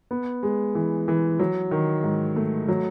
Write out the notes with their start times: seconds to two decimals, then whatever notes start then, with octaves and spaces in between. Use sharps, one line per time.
0.11 B3
0.43 G#3
0.75 E3
1.08 E3
1.40 F#3
1.71 D#3
2.04 G#2
2.36 A3
2.69 F#3